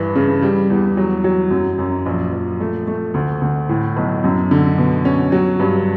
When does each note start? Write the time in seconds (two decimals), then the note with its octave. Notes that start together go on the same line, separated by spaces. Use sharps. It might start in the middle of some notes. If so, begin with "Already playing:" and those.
Already playing: G2 E3
0.15 C#3
0.42 G3
0.70 E2
0.97 F#3
1.24 F#3
1.51 F#2
1.79 F#2
2.06 A#1
2.33 A#1
2.60 A3
2.87 A3
3.14 D2
3.42 D2
3.69 A2
3.97 B1
4.24 F#2
4.51 D3
4.78 B2
5.05 C#4
5.32 F#3
5.59 G2